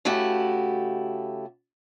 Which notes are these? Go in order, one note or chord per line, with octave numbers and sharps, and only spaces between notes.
C#3 A3 E4 F#4 G4